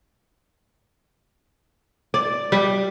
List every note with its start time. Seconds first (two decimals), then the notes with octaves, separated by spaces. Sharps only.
2.14 D5
2.52 G3